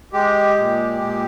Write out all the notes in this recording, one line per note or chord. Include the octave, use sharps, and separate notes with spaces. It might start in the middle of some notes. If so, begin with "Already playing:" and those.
G#3 G4
A#2
A#2